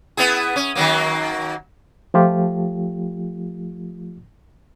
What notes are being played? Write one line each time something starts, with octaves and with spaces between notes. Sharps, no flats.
B3 E4 G#4
C#4
D#3 F#3 A#3
F3 A3 F4 G4